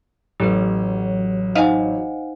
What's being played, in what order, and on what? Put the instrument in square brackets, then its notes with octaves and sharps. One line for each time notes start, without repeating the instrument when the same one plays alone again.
[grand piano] A1 [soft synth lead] F#3 [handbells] G4 A4 B4
[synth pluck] D#4 D#5 F5 [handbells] C5 F#5 G#5